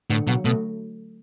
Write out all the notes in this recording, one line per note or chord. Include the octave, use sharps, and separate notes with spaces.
A2 D3
B2 F#3
B2 A3